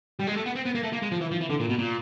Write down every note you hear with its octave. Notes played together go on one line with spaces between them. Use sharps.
G3
G#3
A3
B3
C4
B3
A#3
A3
A#3
G#3
F3
E3
F3
E3
D3
A#2
B2
A#2